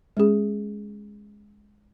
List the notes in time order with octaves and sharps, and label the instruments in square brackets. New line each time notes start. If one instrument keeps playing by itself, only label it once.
[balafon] G#3 C#4 G#4